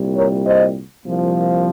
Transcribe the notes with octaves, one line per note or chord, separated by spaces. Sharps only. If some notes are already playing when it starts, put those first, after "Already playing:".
Already playing: C2 A#2 G3
A#4 C#5
C5 D#5
C2 A#2 F3